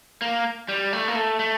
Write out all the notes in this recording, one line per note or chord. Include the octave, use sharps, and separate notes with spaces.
A#3
G3
A3
A#3
A3
A3